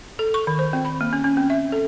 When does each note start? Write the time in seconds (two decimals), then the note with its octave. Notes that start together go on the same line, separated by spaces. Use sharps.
0.19 A4
0.34 C#6
0.47 D#3
0.59 C5
0.73 C4
0.85 B5
1.01 A#3
1.13 C#4
1.24 C#4
1.37 C4
1.50 E5
1.72 A4